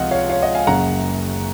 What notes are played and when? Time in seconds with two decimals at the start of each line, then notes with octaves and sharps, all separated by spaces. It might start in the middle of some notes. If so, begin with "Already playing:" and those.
Already playing: C#2 C3 F3 F4 D#5 F#5
0.11 C#5 F5
0.29 C#5 F5
0.42 D#5 F#5
0.55 F5 G#5
0.67 F#1 F#2 C#3 F#5 A#5